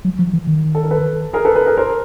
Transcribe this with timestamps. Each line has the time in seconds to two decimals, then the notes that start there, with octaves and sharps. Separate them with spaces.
0.05 F#3
0.19 F3
0.33 E3
0.47 D#3
0.75 A4
0.83 A#4
0.91 A4 B4
1.33 G#4 A#4
1.45 A4 B4
1.56 A4 B4
1.66 G#4 A#4
1.77 A#4 C5